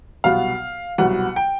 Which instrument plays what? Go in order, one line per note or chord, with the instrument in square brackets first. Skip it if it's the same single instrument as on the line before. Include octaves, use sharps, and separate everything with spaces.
[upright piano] C2 B2 F#3 B3 [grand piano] F5
[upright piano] C2 B2 F#3 B3 [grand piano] F#5
[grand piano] G5